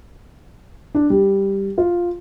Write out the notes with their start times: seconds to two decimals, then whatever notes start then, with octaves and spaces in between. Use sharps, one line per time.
0.95 D4
1.10 G3
1.78 F4